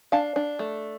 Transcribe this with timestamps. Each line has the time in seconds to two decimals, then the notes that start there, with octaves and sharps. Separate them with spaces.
0.12 D4 F5 A5
0.36 D4
0.59 A3